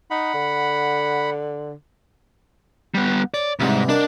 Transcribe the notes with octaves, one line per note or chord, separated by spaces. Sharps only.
D#4 F#5 B5
D3
G3 B3
C#5 D5
C#2 G#2 C3 E3 G3
A#3 D4 D#4 F#4